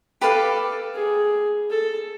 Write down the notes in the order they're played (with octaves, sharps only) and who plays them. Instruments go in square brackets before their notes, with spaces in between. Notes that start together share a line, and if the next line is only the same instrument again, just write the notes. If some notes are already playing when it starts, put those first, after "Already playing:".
[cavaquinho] G4 B4 D5 F5 [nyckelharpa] A4
[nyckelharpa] G#4
A4